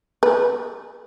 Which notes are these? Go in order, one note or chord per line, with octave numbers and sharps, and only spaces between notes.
B4